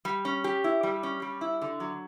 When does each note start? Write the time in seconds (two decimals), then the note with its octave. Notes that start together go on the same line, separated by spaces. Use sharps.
0.05 G3
0.25 C#4
0.44 G4
0.64 E4
0.83 G3
1.03 C#4
1.22 G3
1.41 E4
1.62 D3
1.80 F#3